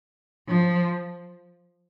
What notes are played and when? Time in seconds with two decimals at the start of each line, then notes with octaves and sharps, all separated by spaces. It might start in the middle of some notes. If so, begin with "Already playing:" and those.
0.49 F3